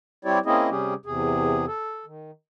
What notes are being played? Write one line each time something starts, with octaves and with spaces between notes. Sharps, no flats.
G3 C4 E4 G4 C#5 D5
A#3 C4 C#4 E4 G#4 D#5
C3 G3 C#4 G4 G#4
E2 C3 G#4
A4
D#3